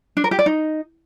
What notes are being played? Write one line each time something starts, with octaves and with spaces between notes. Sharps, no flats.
D4
A#4
G4
D5
D#4